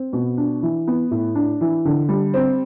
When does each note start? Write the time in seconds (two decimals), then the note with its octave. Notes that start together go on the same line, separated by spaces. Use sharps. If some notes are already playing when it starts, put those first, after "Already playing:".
Already playing: C4
0.13 B2
0.37 D4
0.63 E3
0.87 B3
1.11 A2
1.35 D4
1.61 E3
1.85 D3
2.09 G3
2.34 C4